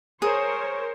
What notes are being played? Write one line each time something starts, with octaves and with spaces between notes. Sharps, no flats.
G#4 A#4 C5 C#5